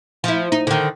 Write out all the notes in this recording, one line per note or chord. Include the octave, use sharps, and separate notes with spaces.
F3 E4
D#4
D3 D#3